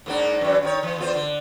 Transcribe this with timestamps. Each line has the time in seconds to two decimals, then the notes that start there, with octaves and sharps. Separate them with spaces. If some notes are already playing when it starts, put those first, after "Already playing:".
0.06 G#2 A#3 D4
0.41 F#2 E3
0.63 D#3 F4 C#5
0.83 E3
0.98 E2 F4 C5
1.14 D3